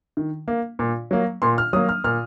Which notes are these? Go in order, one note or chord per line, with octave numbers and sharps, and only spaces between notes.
D#3
A#3
A#2
F#3 A#3
A#2 C6
F6
F#3 A#3 D#6
F6
A#2 F6